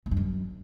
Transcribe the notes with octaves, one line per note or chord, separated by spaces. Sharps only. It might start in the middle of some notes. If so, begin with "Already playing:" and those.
A2
G2
F#2